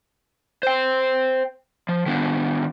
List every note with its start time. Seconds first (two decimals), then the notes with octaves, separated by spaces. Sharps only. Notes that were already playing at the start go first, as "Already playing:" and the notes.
0.63 C5 G5
1.89 F3
2.06 D#3 B3 D4 F4